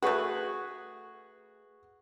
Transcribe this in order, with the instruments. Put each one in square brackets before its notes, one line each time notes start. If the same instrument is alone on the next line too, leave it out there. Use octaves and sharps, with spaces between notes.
[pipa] A3 B4 [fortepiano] F#4 G#4 C#6